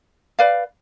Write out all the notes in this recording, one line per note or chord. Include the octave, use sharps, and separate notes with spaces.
B4 D5 F5